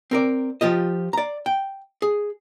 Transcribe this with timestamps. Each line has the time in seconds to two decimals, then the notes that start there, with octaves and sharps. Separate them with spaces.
0.11 C4 A#4 D5
0.61 F3 F4 G4 D#5
1.13 D5 A#5
1.46 G5
2.02 G#4